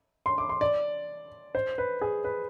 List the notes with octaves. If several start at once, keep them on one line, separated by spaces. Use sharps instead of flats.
C6
D6
C6
D5
C5
B4
G#4
B4